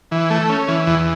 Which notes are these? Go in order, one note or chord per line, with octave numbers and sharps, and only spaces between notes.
E3
A3
C#4
E3
E2